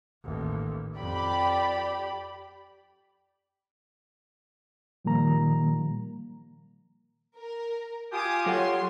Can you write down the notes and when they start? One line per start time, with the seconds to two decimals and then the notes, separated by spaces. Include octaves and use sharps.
0.24 A1 D#2
0.98 F2 G4 D5 B5
5.05 A#2 D#3 F3 G3 A#3 A#5
7.37 A#4
8.12 F4 G4 G#5 D6 D#6
8.46 F#3 A4 C#5 F#5 C6